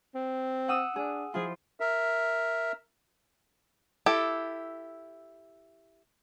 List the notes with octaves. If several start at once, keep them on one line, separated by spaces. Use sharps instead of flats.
C4
F#5 D#6 E6
D4 G#4
F3 E4 F4 G#4
A#4 E5
E4 G4 A4